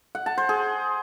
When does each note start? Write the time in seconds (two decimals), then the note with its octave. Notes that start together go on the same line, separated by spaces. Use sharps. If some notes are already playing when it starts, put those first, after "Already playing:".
0.15 F#5
0.26 A5
0.38 C5
0.49 G#4